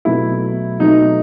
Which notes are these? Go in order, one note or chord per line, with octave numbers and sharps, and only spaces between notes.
B2 F#3 A3 E4
B2 F#3 A3 D#4